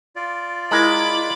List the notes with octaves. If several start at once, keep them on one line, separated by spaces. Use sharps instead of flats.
F4 D5
G#3 E4 A#4 A#5 B5 D6